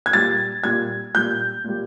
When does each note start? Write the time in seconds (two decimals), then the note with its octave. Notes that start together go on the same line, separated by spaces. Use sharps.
0.06 G#6
0.13 A#2 G3 A6
0.64 A#2 G3 G#6
1.14 A#2 G3 G6
1.64 A#2 G3